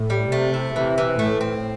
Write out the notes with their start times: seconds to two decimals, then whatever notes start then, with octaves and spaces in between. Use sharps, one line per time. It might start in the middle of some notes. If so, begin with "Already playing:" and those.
Already playing: A2
0.10 G3
0.31 C3 A3
0.54 E4
0.76 C3 E3
0.98 E3
1.19 A2 A3
1.41 C4